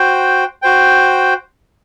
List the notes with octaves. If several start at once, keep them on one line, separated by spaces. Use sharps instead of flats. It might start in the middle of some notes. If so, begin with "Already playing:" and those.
Already playing: F#4 C5 G5
F#4 C5 G5